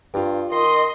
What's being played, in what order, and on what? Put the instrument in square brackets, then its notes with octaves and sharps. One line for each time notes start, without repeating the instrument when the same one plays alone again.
[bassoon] G2 [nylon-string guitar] F4 G5
[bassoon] D#3 [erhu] D#5 [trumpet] C6